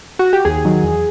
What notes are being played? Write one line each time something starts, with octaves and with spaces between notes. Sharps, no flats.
F#4
G4
D#2 G#4
D#3 F#3
E2